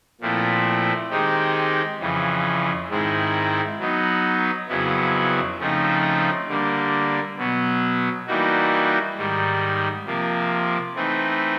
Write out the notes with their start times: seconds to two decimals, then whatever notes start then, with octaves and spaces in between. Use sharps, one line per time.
0.21 A#2 F3 A3 C4 E4
1.10 D#3 G#3 C4 D#4 G4
2.00 F2 C#3 E3
2.89 G#2 D#3 G#3 C4 E4
3.79 F#3 B3 D#4
4.68 F2 C#3 F#3 B3 E4
5.58 C#3 F3 A3 C4 D#4
6.48 D3 G3 A#3
7.38 B2 F#3 B3
8.27 E3 G3 A#3 D#4 F#4
9.17 G#2 D#3 G3
10.06 C3 F3 A#3
10.95 E3 A3 C4 D#4